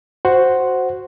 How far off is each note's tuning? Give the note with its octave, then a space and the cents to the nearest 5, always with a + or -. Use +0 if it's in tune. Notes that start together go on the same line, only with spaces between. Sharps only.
F#4 +0 C5 +0 F#5 +0